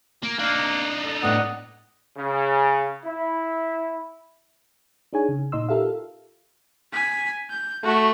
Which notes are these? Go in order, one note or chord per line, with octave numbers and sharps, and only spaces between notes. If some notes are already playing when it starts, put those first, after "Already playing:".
A#3
A#3 D4 D#4 F5 C7
A4
A2 A3 B3 D5 D#5 F#5 D#6
C#3
E4
D4 D#4 G#4 C#5 G#5
C#3
A#2 D#4 D#5 C6 E6
F4 G4 A4 A#4 E5 F5
G#5 B6
G6
A3 F#4 E5